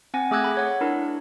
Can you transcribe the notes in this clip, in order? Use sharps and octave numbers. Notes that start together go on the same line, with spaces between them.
C4 F#5 G#5 A#6
A3 G#4 D6 E6 F#6 G#6
B5
C#5 F#5
D4 E4 A#4